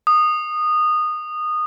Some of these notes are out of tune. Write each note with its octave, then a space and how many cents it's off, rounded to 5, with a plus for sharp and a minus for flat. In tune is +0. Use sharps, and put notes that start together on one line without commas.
D#6 -20